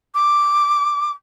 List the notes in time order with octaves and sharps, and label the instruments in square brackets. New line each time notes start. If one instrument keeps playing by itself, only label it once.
[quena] D6